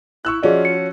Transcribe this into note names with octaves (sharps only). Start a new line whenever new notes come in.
E4 C#6 E6 F#6
F3 C#4 F4 F#4 G#4 D5 D#5
C#7